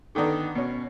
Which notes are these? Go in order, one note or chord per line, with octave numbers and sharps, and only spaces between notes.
D3 D#3 B3 D4 D#4
B2 C#4